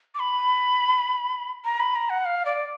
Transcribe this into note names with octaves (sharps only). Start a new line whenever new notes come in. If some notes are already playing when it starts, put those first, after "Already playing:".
D6
B5
A#5
B5
A#5
F#5
F5
D5